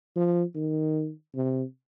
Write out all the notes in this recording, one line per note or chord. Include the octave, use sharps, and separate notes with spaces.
F3
D#3
C3